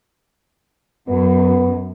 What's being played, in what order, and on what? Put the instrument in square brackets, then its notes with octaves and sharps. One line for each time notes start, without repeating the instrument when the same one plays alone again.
[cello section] F#2 [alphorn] B3